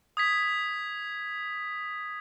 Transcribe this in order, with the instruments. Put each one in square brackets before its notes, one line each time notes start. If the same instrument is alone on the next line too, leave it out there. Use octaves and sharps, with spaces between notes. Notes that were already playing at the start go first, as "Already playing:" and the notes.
[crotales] D#6 G#6 B6